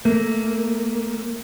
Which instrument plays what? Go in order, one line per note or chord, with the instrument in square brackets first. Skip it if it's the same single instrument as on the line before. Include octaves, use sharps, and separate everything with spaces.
[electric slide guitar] A3 A#3